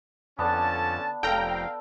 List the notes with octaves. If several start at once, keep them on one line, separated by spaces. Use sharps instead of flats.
F2 D3 B3 C#4 D4 A5
F1 A4 F5 G5 A#5